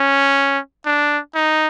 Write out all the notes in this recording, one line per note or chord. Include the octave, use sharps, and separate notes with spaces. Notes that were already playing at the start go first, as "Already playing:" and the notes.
Already playing: C#4
D4
D#4